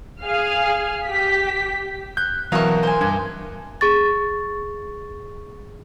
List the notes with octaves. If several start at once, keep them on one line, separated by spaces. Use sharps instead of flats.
G#4 F5 F6
G4 B6
F#6 G6
B2 E3 F#3 A#4 E5 F5 C#6
C5 G#5
G2 G#6
G#4 C#6 A6